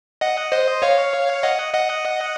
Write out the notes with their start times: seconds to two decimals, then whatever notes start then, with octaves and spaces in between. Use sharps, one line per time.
0.21 D#5 F#5
0.52 C5 D#5
0.82 C#5 F5
1.43 D#5 F#5
1.73 D#5 F#5